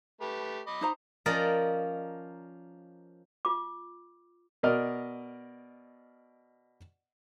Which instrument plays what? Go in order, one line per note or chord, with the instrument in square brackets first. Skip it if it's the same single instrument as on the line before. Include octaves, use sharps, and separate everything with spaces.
[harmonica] A3 G4 B4
D#5 B5 D6
[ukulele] D#4 C5 A#5
[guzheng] F3 C#4 A#4 D5 D#5
[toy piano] F4 D6
[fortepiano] B2 A#4 D5 D#5 F6